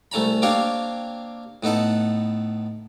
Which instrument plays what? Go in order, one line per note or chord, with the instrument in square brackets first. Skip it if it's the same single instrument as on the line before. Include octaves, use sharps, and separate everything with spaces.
[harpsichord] C2 A3 C#4 A#5 B5
A#3 C4 D4 G4 C#5 F5
A2 B3 D#4 A4 F#5